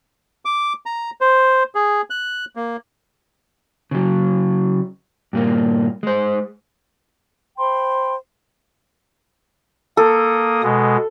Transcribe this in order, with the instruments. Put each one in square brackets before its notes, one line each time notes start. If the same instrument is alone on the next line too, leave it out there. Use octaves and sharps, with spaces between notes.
[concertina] D6
A#5
C5
G#4
F#6
A#3
[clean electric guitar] C#3 F#3
G2 A#2 A#3
G#3 C5
[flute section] C5 G5 B5 C6
[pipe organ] A#3 D#6 [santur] A4
[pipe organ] B2 G#3